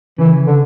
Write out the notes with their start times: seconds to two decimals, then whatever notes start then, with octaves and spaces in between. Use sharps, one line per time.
0.18 C#3 E3
0.46 D3